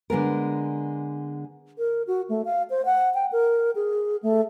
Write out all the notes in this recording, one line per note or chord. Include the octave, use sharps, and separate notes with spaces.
D3 G#3 B3 A#4
A#4
F#4
A3
F5
C5
F#5
G5
A#4
G#4
A3